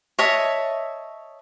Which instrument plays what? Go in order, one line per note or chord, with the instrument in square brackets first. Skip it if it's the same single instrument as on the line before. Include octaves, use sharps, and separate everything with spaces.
[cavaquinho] C#5 D#5 E5 A5